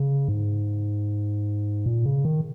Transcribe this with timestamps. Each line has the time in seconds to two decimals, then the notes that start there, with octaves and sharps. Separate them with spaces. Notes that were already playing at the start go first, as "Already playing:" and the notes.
Already playing: C#3
0.28 G#2
1.86 A#2
2.06 C#3
2.25 D#3